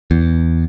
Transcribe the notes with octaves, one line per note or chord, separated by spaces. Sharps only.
E2